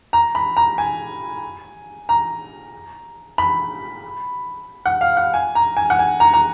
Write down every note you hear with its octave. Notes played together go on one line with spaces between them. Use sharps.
A#5
B5
A#5
G#5
A#5
B5
F#5
F5
F#5
G#5
A#5
G#5
F#5
G#5
A#5
A#5